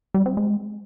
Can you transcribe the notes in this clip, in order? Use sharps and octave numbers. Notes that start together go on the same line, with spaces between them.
G3
C4
G#3